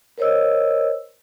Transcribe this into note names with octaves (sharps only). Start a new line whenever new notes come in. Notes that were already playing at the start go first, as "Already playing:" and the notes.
A#4 C5 C#5 D#5 E6